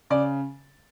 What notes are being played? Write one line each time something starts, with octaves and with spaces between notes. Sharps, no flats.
C#3 D5